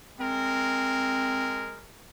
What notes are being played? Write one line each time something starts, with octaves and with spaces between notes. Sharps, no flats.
G#3 C4 A#4